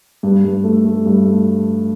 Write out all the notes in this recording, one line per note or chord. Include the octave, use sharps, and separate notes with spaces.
G2
G2
A3
A3
G2
A3